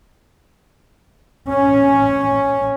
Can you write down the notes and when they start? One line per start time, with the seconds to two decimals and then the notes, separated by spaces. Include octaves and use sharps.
1.49 C#4